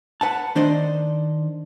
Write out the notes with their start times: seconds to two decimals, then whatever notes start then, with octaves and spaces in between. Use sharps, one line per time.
0.21 B4 F#5 A5
0.55 D#3 D4 C5 D5 D#5